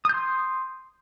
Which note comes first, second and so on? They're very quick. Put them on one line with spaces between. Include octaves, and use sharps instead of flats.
D#6 G6 C6